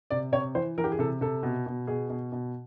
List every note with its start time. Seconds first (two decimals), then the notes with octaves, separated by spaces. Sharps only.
0.10 C3 D5
0.32 C3 C#5
0.55 E3 C5
0.78 E3 A#4
0.84 G4
0.92 G#4
0.99 C3 A4
1.21 C3 A4
1.43 B2
1.66 B2
1.87 B2 G#4
2.09 B2
2.32 B2